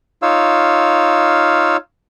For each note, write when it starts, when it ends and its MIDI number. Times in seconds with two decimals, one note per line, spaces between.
0.22 1.77 63
0.22 1.77 65
0.22 1.77 73
0.22 1.77 77
0.22 1.77 88